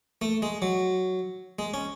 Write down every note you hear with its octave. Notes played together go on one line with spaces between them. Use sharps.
A3
G#3
F#3
G#3
C#4